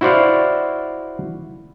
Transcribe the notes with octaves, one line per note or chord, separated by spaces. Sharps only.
E4 F#4 C5 D5 F5